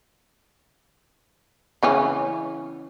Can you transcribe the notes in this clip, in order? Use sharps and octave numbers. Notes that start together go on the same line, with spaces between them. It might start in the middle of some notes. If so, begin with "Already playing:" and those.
C#3 E3 C#4